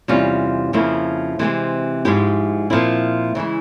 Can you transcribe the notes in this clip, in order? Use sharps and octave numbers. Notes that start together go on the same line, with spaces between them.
E2 C3 G3 C#4 F4
F2 C#3 F3 A#3 E4
C3 E3 G#3 C4 G4
G#2 F3 G#3 E4 G4
A#2 F3 C4 E4
C#3 E3 G#3 E4